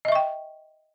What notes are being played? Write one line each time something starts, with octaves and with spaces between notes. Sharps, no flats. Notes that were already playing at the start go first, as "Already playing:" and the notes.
D#5 E5 G5 C#6